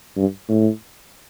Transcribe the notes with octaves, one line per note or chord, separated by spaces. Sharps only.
G2
A2